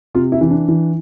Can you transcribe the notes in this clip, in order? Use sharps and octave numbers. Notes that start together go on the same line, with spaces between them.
C3 F4
E4
E3
D4
E3